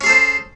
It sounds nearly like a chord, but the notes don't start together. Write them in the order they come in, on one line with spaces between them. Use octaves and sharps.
C#4 G#4 A4 C5